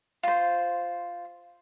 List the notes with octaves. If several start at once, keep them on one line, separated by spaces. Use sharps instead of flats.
F4 C5